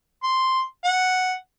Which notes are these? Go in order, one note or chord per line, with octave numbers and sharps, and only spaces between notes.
C6
F#5